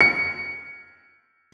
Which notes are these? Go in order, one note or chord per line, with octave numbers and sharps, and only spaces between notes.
C#7